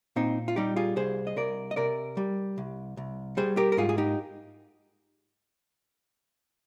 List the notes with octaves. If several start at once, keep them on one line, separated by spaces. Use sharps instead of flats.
A#2 C4 D#4
F4
G3 D#4 G4
F4 G#4
C2 G#4 C5
D#5
C2 A#4 D5
D#5
C3 A#4 D5
G3
C2
C2
G3 G#4 C5
G4 A#4
A#4
G#2 F4 G#4
G#4
D#4 G4